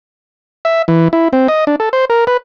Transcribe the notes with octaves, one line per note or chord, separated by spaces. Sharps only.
E5
E3
E4
C4
D#5
D4
A4
C5
A#4
B4